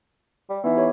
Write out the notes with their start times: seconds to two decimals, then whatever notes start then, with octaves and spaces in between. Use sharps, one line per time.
0.49 G3
0.64 E3 B3 D#4
0.77 G4 C#5